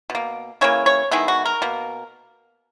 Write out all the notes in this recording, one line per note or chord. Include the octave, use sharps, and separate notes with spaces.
B2
A#3
C#3 E3 A#3 C#5
C#5
D#3 G#3 B3 E4
F#4
A#4
B2 A#3